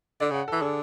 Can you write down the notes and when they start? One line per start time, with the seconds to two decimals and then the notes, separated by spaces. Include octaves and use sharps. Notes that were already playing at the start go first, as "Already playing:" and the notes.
0.20 D3 D5
0.31 C#3 F#5
0.48 A4
0.52 E3
0.61 D3 G#4